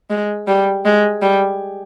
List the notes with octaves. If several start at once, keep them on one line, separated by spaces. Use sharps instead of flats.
G#3
G3
G#3
G3